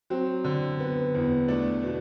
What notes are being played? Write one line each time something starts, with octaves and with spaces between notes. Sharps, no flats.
F#3 C4
D3
B3
E2
A3 D4
B2